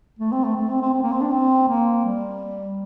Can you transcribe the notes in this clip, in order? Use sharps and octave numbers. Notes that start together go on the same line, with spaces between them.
A3
C4
A3
A3
C4
C4
C4
A#3
C4
D4
C4
A#3
G3